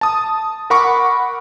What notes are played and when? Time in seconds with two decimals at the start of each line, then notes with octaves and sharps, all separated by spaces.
0.01 A5 D#6
0.70 A#4 F#5 B5 C#6 D6